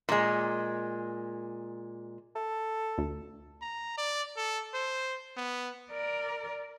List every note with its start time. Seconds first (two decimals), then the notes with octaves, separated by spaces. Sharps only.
0.09 A#2 G#3
2.36 A4
2.98 D2
3.62 A#5
3.98 D5
4.37 A4
4.74 C5
5.37 B3
5.91 A#4 D5